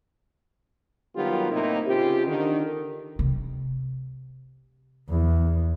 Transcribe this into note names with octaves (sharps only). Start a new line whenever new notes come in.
D#3 F#3 G3 B3 F4 G4
A2 C3 A#3 D#4 E4 C5
C#3 C4 F4 G4
D3 D#3
C3
E2